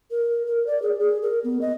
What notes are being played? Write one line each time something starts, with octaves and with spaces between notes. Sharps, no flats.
A#4
A#4
D5
G#4
G#4
A#4
B3
D#5